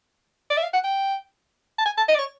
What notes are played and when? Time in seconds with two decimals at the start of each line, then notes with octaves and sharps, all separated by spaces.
0.50 D5
0.57 E5
0.63 F5
0.74 F#5
0.84 G5
1.78 A5
1.85 G#5
1.98 A5
2.08 D#5
2.15 D5
2.19 C#5